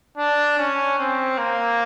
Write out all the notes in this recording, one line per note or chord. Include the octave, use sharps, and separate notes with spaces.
D4
C#4
C4
A#3